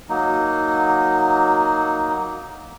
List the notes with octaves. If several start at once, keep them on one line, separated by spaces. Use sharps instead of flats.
F#3 A#3 D#4